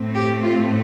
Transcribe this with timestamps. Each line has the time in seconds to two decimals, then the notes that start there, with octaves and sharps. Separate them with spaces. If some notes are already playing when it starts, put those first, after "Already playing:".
Already playing: A2 A3 C4
0.14 G4
0.43 F4